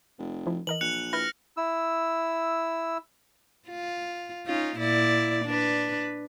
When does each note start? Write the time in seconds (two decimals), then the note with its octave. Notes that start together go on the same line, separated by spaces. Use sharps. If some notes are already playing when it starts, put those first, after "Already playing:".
0.18 F1
0.47 F3 E4
0.67 E3 A#4 D#5 F#7
0.81 A#1 F#6 C#7 F7
1.13 E4 B4 F6 A#6
1.57 E4 E6
3.68 F4
4.47 C#4 D#4 F4
4.77 A#2 E4 D5
5.45 D4 B4